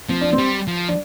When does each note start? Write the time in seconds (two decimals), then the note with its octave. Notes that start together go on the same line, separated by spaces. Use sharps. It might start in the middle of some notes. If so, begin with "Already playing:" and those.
0.09 F3 C4
0.21 D4
0.33 C4
0.38 G3
0.68 F3
0.89 D4